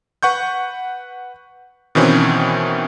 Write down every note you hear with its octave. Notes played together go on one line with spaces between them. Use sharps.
B4 F#5 C#6 G6
B2 D#3 E3 C4 C#4